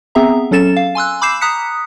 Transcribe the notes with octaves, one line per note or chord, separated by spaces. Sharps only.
B3 C4 G#4 E5 A#5
F#3 C#4 A4 A6 E7
F5
G#5 C6 E6 F#6
B5 D6 E6 G6 C7 E7
A#5 D#6 F#6 B6 C#7